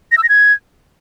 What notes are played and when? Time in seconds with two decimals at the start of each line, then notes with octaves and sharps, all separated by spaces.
0.12 A#6
0.18 E6
0.23 A#6
0.29 G#6